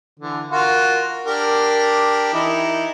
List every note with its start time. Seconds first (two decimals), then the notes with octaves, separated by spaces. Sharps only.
0.20 D3 E3
0.51 F4 F#4 A#4
1.26 D4 G4 A#4
2.34 E3 D#4 E4